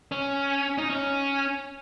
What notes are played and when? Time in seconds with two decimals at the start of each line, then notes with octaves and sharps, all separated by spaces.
0.12 C#4
0.78 D#4
0.90 C#4